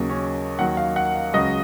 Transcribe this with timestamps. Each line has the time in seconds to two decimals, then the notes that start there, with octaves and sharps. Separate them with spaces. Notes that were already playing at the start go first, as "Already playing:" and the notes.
Already playing: D#2 C#3 F#3
0.09 C#4
0.59 D#2 D#3 F#3 F#5
0.77 F5
0.96 F#5
1.15 F5
1.33 C#2 C#3 F#3 D#5